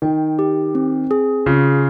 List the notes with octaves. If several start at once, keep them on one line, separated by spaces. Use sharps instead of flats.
D#3 G5
G4
C4
G#4
C#3 F4